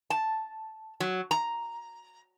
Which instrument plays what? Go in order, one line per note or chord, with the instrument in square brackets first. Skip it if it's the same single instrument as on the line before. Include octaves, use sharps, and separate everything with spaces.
[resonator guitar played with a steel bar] A5
F#3
A#5